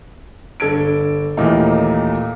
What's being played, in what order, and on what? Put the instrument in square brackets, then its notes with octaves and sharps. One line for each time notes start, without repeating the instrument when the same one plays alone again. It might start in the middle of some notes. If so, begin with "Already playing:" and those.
[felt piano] G1 A4 G#6 D7
D#2 A#2 E3 A3 A#3 D#4